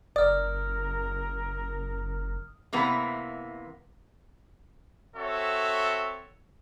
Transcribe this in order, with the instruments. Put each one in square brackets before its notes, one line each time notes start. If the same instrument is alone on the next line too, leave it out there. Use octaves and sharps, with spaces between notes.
[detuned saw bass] F#1 [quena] A#4 [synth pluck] D5 [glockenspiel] D#6 F6
[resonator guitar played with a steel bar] C3 E3 A#3 B3
[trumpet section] C4 F#4 A4 C#5 E5